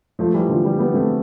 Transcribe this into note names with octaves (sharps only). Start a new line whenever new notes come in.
F3 A3
E3 G3
D3 F3
E3 G3
G3 B3
A3 C4